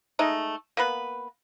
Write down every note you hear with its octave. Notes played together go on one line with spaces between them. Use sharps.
G#3 A3 D#4
A#3 B3 B4